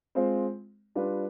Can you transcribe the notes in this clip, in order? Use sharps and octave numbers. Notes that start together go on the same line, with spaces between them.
G#3 C4 F4 C5
G3 D4 F4 B4